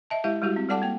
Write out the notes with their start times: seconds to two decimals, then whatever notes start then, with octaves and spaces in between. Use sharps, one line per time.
0.10 D#5 E5 A5
0.24 G#3 E4 G4 E5 F5
0.42 G3 G#3 E4 F#4 G4
0.56 C4
0.69 G3 A4 D5 F#5 A5 D6
0.82 A#3 G5